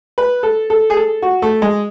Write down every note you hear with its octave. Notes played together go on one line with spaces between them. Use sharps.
B4
A4
A4
G#4
A4
F#4
A3
G#3